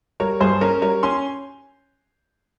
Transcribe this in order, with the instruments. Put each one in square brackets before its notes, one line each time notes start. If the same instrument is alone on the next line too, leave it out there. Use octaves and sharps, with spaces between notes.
[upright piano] G3 A#4 C#5
G2 G#4 C5
C#4 A#4 C#5
G3 A#4 C#5
C#4 G#5 C6